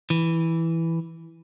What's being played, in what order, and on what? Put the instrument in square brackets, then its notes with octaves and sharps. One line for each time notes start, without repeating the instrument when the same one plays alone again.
[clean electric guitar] E3